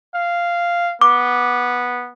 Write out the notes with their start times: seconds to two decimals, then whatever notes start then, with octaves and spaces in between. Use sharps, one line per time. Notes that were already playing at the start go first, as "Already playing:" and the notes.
0.15 F5
1.01 B3 D6